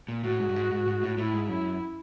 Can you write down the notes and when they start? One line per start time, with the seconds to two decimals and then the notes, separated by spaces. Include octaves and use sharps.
0.08 A#2
0.24 A2 F#4
0.40 G#2
0.49 G2
0.56 G#2
0.71 G#2
0.87 G#2
1.03 A2
1.18 A2 E4
1.33 G#2
1.49 F#2 E4